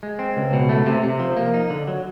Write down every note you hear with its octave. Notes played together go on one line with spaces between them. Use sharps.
G#3
C4
C#2
B2
A3
C3
C3
F3
A#3
D#4
D3
F#3